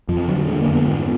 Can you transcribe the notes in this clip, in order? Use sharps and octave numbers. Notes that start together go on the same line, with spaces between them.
F2 F3
D3 F#3
D3 G#3
A#3
F2
B3
G#2